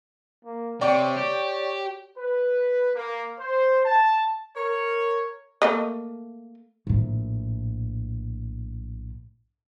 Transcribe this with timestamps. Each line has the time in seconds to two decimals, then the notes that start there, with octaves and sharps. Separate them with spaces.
0.45 A#3
0.81 C3 C#5 D5 G5 C#6
1.17 G4
2.18 B4
2.95 A#3
3.39 C5
3.85 A5
4.56 A#4 C#5
5.62 A3 A#3 D#5
6.87 A#1 A2